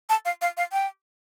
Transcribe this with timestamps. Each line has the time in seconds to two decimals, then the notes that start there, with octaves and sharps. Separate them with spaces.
0.09 A5
0.25 F5
0.41 F5
0.57 F5
0.72 G5